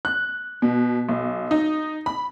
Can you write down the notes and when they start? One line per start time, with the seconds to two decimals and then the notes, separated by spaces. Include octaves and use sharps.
0.05 F#6
0.62 B2
1.09 B1
1.51 D#4
2.06 B5